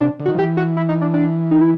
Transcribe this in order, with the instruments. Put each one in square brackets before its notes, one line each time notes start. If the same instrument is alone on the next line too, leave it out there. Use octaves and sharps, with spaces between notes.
[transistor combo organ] C3 [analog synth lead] D4
[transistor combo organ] D3
[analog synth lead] F#4
[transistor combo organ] D#3
F3
[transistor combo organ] E3 [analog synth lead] G4
[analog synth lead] F#4
E4
D#4
D4
D4
D#4
E4